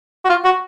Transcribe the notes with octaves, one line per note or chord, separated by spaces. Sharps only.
F#4
F4
F#4